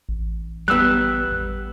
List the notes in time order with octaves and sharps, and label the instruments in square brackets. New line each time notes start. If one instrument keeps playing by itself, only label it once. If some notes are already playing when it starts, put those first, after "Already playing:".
[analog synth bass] A1
[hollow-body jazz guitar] G3 B3 [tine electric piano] E6 F#6